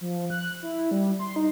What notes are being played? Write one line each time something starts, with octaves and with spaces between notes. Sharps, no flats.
F3
F#6
E4
G3
C6
D#4